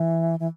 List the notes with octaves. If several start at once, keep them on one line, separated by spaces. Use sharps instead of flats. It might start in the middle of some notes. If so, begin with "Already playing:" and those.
Already playing: E3
E3